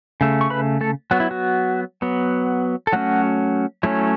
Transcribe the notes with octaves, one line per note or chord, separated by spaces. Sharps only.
C#3 A3
C#6
B4 B5
A3 A4
F#3 B3 F#4
E4
F#4
F#3 B3
A4
F#3 A3 C#4 F#4
F#3 A3 C#4 E4